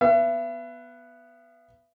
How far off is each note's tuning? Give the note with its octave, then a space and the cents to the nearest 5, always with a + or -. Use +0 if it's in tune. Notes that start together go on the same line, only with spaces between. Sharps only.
B3 +0 E5 +40